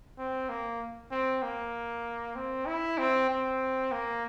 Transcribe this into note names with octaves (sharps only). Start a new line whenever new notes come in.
C4
A#3
C4
A#3
C4
E4
C4
C4
A#3